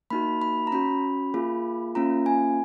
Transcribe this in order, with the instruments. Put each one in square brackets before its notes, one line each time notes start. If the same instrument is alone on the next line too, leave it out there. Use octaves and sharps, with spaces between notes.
[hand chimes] A#3 D#4 F#4 B5
B5
A#5
C#4 F#4 B5
A#3 F4 G#4
A#3 C#4 F4 A#5
G#5